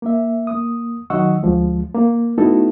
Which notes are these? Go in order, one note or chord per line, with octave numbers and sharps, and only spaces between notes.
A#3 E5
A#3 D#6
D#3 F#3 D#5 F#5 C#6 E6
D2 F3 G#3
A#3
A3 B3 D#4 E4 F#4 A4